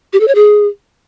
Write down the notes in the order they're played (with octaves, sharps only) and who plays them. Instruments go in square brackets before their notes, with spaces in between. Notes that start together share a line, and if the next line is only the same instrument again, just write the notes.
[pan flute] G4
A4
C#5
G#4